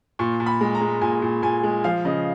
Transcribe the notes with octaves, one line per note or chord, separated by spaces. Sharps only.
A#2 C#6
A#2
B5
G#3
A#5
G#3
A#2 G#5
A#2
A#2 G#5
G#3
F3 F5
C#3 D#5